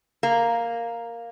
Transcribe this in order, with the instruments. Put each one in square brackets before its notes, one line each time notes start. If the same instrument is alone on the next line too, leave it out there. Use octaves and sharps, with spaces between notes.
[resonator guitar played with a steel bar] A#3